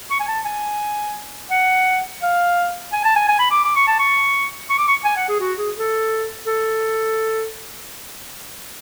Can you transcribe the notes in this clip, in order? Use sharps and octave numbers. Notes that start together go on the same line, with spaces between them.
C#6
G#5
A5
G#5
F#5
F5
G#5
A5
G#5
G#5
B5
D6
D6
C#6
A5
C#6
C#6
D6
C#6
G#5
F#5
G#4
F#4
G#4
A4
A4